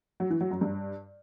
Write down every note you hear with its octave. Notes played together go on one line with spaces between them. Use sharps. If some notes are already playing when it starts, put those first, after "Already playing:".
F#3
E3
F#3
F#2
G2